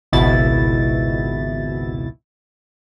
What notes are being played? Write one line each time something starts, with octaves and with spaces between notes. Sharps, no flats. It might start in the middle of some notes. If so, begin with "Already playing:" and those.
G#1 C#2 B2 E4 A6